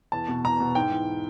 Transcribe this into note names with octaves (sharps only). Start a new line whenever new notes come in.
E2 A5
B2
E2 A#5
B2
G#2 G5
E3